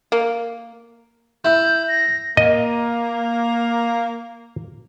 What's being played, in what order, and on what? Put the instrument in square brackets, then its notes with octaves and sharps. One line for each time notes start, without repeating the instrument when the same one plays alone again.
[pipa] A#3
[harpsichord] E4 [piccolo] G6
[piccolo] A#6
[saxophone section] A#3 [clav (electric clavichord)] D#5